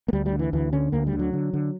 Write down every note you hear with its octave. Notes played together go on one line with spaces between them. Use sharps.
A#3
D2 G3
G3
D3
E3
D2 E3
D3 C#4
D2 A#3
G3
D3
F#3
D3
D3